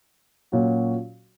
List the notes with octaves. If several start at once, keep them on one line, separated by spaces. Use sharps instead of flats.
A#2 F#3 C#4 F#4